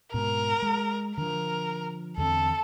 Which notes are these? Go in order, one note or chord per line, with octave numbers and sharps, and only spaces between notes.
G#2 B2 A#4
G#3
D3 F3 A#4
E2 D3 C4 A4